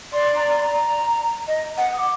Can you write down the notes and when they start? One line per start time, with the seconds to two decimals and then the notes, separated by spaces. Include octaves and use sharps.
0.12 D5 C6
0.34 A#5
0.58 C6
0.61 A#5
1.48 D#5
1.78 F#5
1.93 D#6
1.97 D6